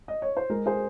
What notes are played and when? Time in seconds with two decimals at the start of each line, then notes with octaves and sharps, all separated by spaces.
0.08 D#5
0.22 C#5
0.37 C5
0.50 G#3 A#4
0.66 G#4 C5